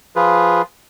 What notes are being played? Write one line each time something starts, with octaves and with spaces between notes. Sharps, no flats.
F3 F4 G#4 B4